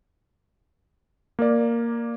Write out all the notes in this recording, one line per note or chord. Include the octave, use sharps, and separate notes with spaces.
A#3 A#4 D5